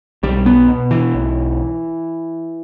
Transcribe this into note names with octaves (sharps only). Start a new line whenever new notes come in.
B1 G3
B3
B2
E3
B1